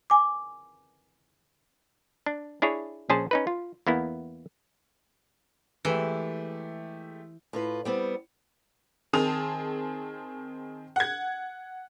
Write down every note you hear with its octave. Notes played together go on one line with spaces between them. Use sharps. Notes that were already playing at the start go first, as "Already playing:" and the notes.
G#5 D6
D4
D4 E4 G#4 C#5
A#1 C#4 G#4 C5 A5
C#4 D#4 B4
F4
E2 A#3 B3 E4
E3 G#3 A3 G4
A2 F4 B4
G3 B3 C4
D#3 C4 G#4 A5 D#6 F7
F#5 G#6